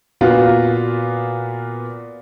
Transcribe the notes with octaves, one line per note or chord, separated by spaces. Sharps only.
A#2 B3 F4 F#4